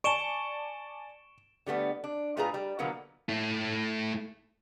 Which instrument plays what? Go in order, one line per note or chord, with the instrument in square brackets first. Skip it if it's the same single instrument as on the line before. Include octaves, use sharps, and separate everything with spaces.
[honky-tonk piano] D5 G#5 A5 [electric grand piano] C#6 [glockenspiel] D7 E7 G7
[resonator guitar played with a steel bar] D3 G3 A3 B3
D4
A2 A3 F4 G#4 B4 A#5
G3
B2 D3 F3 F#3 A#3 B3
[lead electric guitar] A3 E4